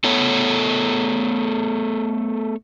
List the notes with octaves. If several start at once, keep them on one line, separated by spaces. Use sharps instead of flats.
A3 B3 A4 C#5